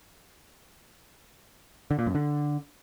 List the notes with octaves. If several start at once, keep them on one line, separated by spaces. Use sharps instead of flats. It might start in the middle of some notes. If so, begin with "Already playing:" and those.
D3
A#2
F#2
D3